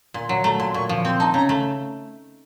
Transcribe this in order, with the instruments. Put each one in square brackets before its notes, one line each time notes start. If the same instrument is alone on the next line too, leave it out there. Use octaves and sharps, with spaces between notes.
[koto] A#2 [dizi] C6
[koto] F#3
[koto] A3 [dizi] A#5
[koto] A#2 [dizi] C6
[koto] A#2 [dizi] C#6
[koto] F3
[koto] C4 [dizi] C6
[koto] D#4 [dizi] A5
[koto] C#3 [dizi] A#5
[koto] A3